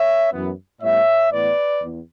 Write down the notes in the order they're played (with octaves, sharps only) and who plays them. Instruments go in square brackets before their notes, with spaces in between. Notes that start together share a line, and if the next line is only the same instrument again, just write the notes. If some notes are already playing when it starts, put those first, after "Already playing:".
Already playing: [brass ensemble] C#5 E5
F#2 E3 B3
A2 G3 B3 C#5 E5
A2 E3 B3 B4 D5
E2